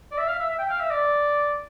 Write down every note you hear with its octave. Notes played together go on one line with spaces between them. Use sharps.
D5
E5
F5
E5
E5
G5
F5
E5
D5